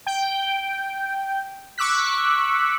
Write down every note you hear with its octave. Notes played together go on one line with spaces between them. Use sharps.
G5
C#6 D6 E6 F#6 B6